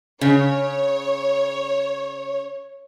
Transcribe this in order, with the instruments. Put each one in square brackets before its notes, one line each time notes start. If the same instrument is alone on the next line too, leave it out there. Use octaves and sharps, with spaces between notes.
[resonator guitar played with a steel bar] C#3 [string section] C#5